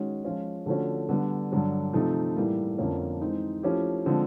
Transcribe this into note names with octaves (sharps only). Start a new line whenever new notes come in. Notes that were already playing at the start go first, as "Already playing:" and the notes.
Already playing: D#3 G#3 C#4 F#4
F3 G#3 C#4 F4
D3 F3 A3 C#4 F#4
D3 G3 B3
G2 D3 F#3
C3 F3 A3 C4 D#4
A2 E3 G3 A#3
F2 D3 F3 A#3 C#4
E3 G#3 C4 D#4
F3 A3 C#4 E4 G4
D3 F3 G#3 C4